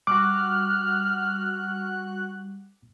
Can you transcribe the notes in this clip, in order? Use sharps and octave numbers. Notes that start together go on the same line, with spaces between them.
G3 F#4 D6 F6 F#6